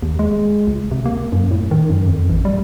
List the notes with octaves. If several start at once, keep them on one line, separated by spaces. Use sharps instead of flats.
D#2
G#3
C#2
C3
A#3
F#2
A2
D#3
F#2
F2
A1
G3